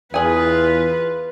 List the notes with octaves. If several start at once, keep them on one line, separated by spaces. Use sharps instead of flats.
E2 F4 G#4 B4 G#5